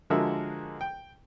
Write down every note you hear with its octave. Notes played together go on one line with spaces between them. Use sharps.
D3 F3 G#3 F#4 A#4 E5
G5